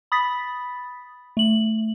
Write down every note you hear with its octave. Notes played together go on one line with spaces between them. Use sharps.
B5 D#6 A6 B6
A3 F#7